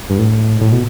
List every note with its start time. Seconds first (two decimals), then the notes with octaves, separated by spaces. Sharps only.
0.10 G2
0.19 A2
0.61 A2
0.72 B2